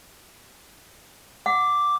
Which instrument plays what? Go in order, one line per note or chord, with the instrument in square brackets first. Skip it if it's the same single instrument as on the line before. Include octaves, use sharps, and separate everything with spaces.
[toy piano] F#5 [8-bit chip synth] D6